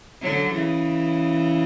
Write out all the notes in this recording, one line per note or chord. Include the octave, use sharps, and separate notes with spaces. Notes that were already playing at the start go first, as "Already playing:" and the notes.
D3 F#3
C#3 E3